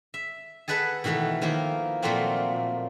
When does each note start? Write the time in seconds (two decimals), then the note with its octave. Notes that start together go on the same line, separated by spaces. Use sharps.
0.14 E5
0.68 G#4 A4 B4 E5 F#5 A5
1.04 B2 D#3 E3 A3 B3
1.41 D#3 F3 A#3 E4
2.03 A#2 F3 F#3 A3 A#3 C4